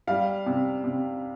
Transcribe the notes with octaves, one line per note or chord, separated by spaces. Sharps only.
G3 F5
C3
C3